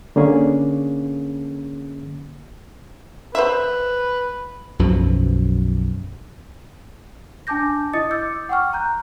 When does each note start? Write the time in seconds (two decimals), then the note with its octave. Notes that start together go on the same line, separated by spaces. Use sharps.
0.16 D3 A#3 C#4 G#4
3.35 B4 C5 E5
4.79 B1 F#2 B2 F3
7.47 D4 G#5 A5 D6 G6 A#6
7.93 E4 D#5 D#6 A6 C#7
8.11 D6 E6 G6 A6 C#7
8.49 F#5 G5 C#6 F6
8.73 A#5 F#6 G6